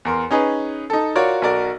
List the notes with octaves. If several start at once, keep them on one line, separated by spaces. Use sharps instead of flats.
E2 A#4 C6
C#4 D#4 G#4 B4
D#4 A4
F4 F#4 A#4 C#5 D5
B1 F#4 A#4 D5